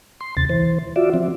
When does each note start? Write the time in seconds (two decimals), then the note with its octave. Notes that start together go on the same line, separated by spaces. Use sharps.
0.21 C6
0.37 D#2 C3 A6
0.49 E3 C5
0.96 F4 F#4 D5 E5
1.14 F3 C4